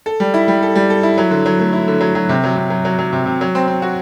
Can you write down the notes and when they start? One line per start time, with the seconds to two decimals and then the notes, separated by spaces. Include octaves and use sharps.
0.06 A4
0.20 G3
0.34 E4
0.48 G3
0.62 A4
0.76 G3
0.90 A4
1.03 E4
1.18 F#3
1.31 D3
1.46 F#3
1.59 A3
1.73 E4
1.88 D3
2.01 F#3
2.15 F#3
2.29 C3
2.44 F#3
2.57 C3
2.70 F#3
2.85 F#3
2.99 F#3
3.13 C3
3.26 C3
3.41 F#3
3.55 C4
3.68 C4
3.82 F#4